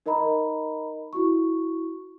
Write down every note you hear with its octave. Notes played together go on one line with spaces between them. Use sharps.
D#4 A#4 D#5 A#5 B5
E4 F#4 C#6